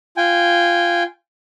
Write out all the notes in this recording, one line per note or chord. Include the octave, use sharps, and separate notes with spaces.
F4 G5 G#5